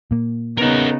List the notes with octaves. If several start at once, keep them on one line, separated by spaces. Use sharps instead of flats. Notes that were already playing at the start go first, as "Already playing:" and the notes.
A#2 A#3
C#3 B3 D#4 A#4 F#5